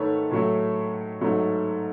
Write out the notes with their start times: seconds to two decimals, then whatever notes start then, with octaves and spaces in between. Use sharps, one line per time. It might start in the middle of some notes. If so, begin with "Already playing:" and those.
Already playing: G#2 D#3 A3 A4 B4 C#5
0.31 A2 F#3 A3
1.21 G#2 F#3 A3